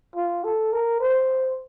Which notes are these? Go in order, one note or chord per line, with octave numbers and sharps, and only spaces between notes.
F4
A4
A#4
C5